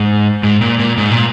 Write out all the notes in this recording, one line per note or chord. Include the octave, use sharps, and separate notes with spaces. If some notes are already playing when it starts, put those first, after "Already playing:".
Already playing: G#2
G#2
A#2
A#2
G#2
A#2